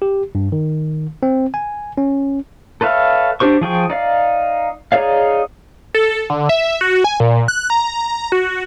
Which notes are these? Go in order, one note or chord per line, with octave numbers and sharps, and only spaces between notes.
G4
G2
D#3
C4
G#5
C#4
A4 B4 C#5 E5 F5
D4 G4 C5 C#6
F3 G#4 G5 C#6
D#4 D5 F5
D#4 G#4 C#5 D5 F5
A4
D3
E5
F#4
G#5
A#2
F#6
A#5
F#4